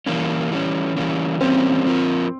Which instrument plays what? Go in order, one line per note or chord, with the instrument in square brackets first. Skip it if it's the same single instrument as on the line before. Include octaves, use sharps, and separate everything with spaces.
[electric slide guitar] E3 G3 A#3 C#4
E3 G3 A#3 C#4
E3 G3 A#3 C#4
[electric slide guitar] E3 G3 A#3 C#4 [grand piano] C4
[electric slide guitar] F3 C4 F4 A#4